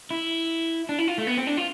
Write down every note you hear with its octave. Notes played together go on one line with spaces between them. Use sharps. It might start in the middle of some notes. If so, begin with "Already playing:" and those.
E4
D4
E4
F4
A3
B3
C4
D4
F4